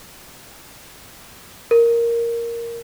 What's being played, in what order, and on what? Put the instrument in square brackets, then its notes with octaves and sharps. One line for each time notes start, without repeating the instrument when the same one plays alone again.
[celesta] A#4